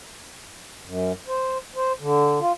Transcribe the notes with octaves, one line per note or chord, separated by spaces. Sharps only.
F#2
C5
C5
D3
F4